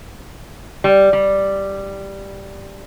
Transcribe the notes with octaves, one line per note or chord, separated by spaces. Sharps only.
G3
G3